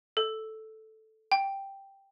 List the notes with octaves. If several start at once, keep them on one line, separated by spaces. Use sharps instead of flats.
A4
G5